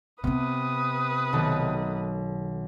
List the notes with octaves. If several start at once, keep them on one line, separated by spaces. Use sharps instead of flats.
C3 B3 C4 B4 D#6
B1 D#3 A3